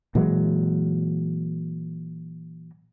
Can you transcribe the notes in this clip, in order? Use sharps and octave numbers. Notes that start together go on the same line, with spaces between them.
A#2 E3 F#3 G#3